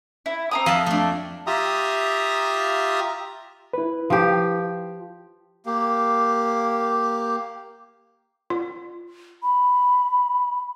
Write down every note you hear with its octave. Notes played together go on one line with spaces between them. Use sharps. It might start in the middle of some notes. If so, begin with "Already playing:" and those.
E4
C4 A#5 D#6
F2 F4 E5 A5
A3 D4
F4 G4 E5 A#5 D#6
E4 B4
F3 G4
A#3 G4
F4
B5